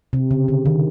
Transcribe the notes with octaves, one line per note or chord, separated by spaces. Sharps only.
C3
C#3
D3
D#3